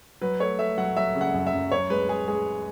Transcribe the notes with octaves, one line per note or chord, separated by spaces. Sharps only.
F#3 B4
A3 C#5
A3 E5
F#3 F#5
F#3 E5
C#3
F#5
F#2
E5
F#2
F#2 C#5
G#3 B4
G#3 G#4
G#3 G#4